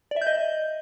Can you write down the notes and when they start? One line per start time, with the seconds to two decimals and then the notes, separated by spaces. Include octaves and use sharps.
0.11 D5
0.16 E5
0.21 G6
0.27 D#5